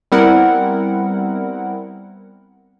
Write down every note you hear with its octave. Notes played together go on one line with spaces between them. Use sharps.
G3 B3 C4 E4 A#4 F#5